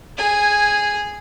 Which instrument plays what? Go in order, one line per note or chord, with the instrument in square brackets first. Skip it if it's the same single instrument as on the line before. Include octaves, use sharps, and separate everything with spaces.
[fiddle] G#4 G#5